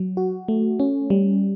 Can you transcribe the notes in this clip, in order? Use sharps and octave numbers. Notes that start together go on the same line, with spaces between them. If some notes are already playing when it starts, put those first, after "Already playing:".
Already playing: F#3
F#4
A3
C#4
G3